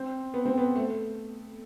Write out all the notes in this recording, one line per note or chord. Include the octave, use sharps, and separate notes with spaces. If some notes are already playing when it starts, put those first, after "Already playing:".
Already playing: C4
B3
C4
B3
A3